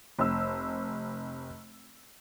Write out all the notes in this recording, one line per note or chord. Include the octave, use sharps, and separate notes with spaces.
F1 E6